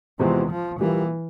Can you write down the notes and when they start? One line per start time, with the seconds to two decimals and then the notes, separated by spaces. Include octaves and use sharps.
0.19 E2 C3 E3 F3 G#3 C4
0.50 F3
0.80 A#1 A#2 E3 G3 A#3